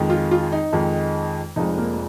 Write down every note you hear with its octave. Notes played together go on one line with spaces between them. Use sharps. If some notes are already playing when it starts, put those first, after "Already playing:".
Already playing: F2 D#3 G#3
F4
F4
D#4
F2 D#3 G#3
F1 F2 F3 G#3 D#4
A#3